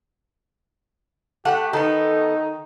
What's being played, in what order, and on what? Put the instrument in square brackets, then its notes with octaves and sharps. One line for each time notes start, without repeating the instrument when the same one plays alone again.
[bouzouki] A3 [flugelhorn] G4 [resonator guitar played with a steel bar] F#5
[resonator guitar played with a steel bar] D#3 [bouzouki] B3 A4 [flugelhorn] D#4